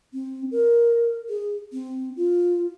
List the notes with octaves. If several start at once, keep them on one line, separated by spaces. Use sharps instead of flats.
C4
A#4
G#4
C4
F4